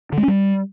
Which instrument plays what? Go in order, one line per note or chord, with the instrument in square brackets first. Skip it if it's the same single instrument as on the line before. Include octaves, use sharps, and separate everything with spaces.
[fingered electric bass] D3
G#3
C#4
G3